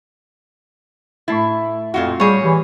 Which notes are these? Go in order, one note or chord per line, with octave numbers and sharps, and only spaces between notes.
A2 A3 E4 A6
F2 A#2 F4 F#4
G3 G#4 C#5
E3 G4